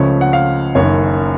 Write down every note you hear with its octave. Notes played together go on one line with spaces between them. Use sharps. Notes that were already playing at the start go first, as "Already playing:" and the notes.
Already playing: C#2 C#3 F3 A3 C#5
F#5
F5
F#1 F#2 D#3 C#5